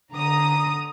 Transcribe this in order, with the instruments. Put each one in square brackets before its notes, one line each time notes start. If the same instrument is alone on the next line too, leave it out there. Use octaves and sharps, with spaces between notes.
[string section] D3 A#5 D#6